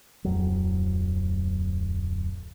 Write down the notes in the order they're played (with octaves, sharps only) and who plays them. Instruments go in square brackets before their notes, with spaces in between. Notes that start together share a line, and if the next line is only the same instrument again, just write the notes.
[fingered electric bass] D1 F2 F#3